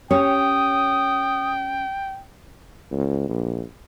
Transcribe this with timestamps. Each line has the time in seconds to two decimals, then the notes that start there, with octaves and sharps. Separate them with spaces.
0.11 C#4 G4 C#5 G5 D#6
2.92 C#2
3.29 A#1